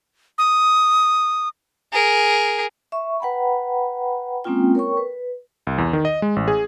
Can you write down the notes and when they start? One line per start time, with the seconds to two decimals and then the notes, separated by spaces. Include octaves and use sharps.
0.38 D#6
1.93 G#4 A#4
2.92 E5 C#6
3.20 B4 F#5 G5 A#5 B5
4.44 G#3 A#3 C4 C#4 F4 G5
4.75 A#4 C#5 G5 C#6
4.97 B4
5.67 C2
5.78 E2
5.93 D#3
6.05 D#5
6.22 G#3
6.36 A1
6.48 G#4